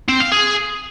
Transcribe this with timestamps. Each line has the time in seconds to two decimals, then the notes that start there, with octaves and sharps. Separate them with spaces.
0.09 C4
0.20 F5
0.32 G#4